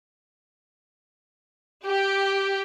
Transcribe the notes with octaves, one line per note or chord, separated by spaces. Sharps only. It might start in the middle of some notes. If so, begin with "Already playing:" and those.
G4